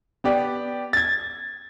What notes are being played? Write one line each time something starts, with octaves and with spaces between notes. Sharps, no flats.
B3 G4 D5
G#6 A6